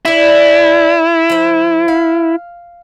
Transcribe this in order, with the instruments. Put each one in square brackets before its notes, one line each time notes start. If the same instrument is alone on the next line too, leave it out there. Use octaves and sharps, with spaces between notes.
[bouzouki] D4 B4 [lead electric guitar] E4
[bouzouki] F3 C5
F5